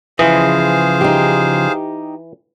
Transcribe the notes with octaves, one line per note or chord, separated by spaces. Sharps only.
C#3 E3 F3 G#4 C5 D#5 F5
D#4 G4